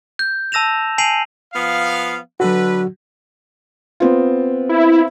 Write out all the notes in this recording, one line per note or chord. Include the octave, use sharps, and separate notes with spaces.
G6
A5 E6 A#6 E7 F7
G#5 A5 C7 D#7 F7 F#7
F3 B3 F5
D3 F#3 F#4 B4
B3 C4 F4
E4